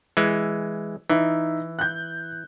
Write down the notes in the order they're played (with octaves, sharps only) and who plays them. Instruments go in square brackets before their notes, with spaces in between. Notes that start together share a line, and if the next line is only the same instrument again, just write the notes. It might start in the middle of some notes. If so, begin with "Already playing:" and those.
[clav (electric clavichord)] E3 G#3
[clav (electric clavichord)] E3 [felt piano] D#4 E5
[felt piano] F#6 G6